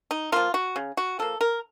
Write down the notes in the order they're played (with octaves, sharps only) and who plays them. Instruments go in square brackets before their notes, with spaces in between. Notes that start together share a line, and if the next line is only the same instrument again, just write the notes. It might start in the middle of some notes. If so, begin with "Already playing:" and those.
[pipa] D#4
F3 A#3 F4
F#4
C#3
F#4
F3 A#3 A4
A#4